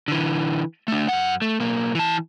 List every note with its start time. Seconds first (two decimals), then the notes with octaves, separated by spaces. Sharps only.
0.08 D3 E3
0.88 A3 D4
1.08 F#2 F#5
1.42 A3
1.60 B1 A#3
1.95 E3 A5